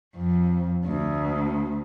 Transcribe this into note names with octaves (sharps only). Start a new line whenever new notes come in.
F2
D2